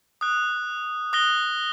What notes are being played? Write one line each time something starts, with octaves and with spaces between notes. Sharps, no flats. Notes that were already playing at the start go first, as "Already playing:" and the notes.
D#6 F#6
D#6 F#6 A#6 G7